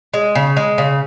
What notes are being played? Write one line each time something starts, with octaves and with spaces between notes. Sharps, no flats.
G#3
C#3
G#3
C#3